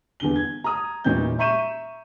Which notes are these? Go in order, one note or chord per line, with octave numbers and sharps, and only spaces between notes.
E2 D3 G7
G#6
A#5 D#6
E1 A#2 E3 C#4 D#4 G6
E5 A#5 C#6 G6 D#7 E7